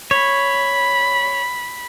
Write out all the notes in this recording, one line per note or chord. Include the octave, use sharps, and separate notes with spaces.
C#5 B5